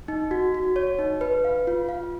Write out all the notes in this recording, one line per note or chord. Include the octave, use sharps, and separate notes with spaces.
D#4
F#4
F#4
C#5
D#4
B4
F5
F4
F5